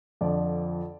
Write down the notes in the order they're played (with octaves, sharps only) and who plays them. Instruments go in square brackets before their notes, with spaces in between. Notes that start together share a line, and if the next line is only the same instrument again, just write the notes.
[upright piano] F2 D3 F3 D5